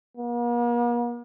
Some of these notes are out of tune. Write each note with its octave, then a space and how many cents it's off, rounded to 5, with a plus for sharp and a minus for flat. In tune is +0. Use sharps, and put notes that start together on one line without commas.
A#3 +45